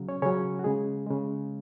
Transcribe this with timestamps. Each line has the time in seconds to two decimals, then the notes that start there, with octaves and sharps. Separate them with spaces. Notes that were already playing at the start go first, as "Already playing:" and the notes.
Already playing: C#3 F#3
0.09 C#4 C#5
0.22 C#3 F#3 C#4 C#5
0.59 F#4
0.64 C#3 G#3 G#4
1.07 C#3 G#3